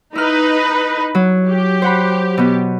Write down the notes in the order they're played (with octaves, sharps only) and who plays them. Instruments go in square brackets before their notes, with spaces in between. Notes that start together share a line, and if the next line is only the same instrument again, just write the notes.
[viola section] D#4 B4 [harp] E4 F6
[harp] F#3
[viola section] G4
[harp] C5 F#5 B5
B2 B3